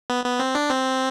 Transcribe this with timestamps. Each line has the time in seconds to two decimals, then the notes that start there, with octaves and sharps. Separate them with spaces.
0.10 B3
0.25 B3
0.39 C4
0.55 D4
0.70 C4